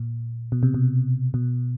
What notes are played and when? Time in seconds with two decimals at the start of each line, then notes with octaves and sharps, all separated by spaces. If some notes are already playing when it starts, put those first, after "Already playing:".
Already playing: A#2
0.52 B2
0.63 C3
0.74 B2
1.34 B2